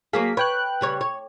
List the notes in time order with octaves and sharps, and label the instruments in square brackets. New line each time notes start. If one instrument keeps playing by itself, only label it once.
[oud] F#3 A#3 G#4 [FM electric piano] F5 B6
[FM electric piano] B4 G5 F#6 [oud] C#5
[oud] C#3 G3 C#5
C#5